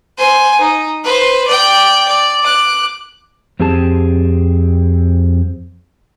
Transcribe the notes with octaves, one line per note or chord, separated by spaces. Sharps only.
C5 G#5
D#4
B4 C5
D5 G5
D5
D6 F#6
F2 C4 G4 G#4 A5